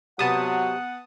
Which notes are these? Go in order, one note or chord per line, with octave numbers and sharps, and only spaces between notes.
C3 F#3 B3 F#5 A5 D#6